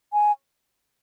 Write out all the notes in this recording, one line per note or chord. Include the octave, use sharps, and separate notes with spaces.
G#5